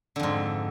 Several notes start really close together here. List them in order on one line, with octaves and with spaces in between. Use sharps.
D3 F2 G#2